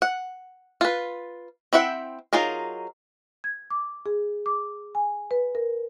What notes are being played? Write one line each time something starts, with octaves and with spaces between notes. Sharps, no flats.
F#5
F4 B4
C4 E4 E5 F#5 G5
F#3 D#4 F4 G#4 A#4
G#6
D6
G#4
D6
G#5
B4
A#4